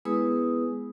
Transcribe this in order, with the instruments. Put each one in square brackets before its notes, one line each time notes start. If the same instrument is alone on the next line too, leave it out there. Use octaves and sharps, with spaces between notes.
[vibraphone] G#3 B3 E4 G#4 B4 D#6